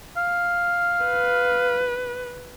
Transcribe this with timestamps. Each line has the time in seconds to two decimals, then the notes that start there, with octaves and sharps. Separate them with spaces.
0.17 F5
1.05 B4